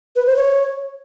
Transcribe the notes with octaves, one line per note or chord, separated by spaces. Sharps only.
B4
C5
C#5